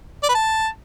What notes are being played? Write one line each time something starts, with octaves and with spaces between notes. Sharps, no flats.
D5
B4
A5